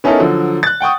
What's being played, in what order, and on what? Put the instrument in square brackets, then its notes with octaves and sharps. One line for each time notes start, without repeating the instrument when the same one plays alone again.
[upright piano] B3 C#4 D#4 E4 A4 A#4
D3 F3 F#3
F#6 A6
F#5 G5 C#6 D#6